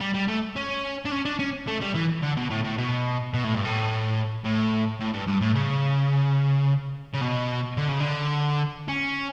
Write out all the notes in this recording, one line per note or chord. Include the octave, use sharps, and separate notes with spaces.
G3
G3
A3
C#4
D4
C#4
D4
C#4
A3
G3
E3
D3
B2
A2
A2
B2
B2
A2
G2
A2
A2
A2
G2
G2
A2
C#3
C#3
B2
D3
C#3
D3
C#4